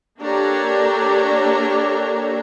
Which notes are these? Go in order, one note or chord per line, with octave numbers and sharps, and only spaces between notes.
A#3 D4 G4 A4 C#5 A#5